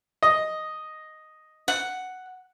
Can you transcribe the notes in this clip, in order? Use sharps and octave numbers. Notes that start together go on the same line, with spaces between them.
D#5
F#5